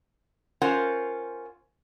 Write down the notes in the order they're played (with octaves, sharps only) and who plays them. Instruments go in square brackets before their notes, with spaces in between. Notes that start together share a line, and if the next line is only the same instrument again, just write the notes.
[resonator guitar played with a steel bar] C#4 F4 A#4 C5 F#5